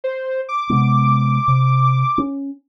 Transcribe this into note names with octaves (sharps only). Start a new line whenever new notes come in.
C5
D6
C3 G#3 B3
C3
C#4